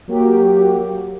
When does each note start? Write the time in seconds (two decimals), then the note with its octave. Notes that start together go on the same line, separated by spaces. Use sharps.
0.08 F#3 A#3 F#4 G4